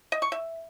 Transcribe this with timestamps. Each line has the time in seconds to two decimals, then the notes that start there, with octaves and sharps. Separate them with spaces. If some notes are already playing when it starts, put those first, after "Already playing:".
0.12 D#5
0.22 C#6
0.32 E5